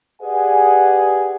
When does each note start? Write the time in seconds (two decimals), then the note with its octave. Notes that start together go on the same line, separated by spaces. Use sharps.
0.22 G4 G#4 B4 D5 F#5 G#5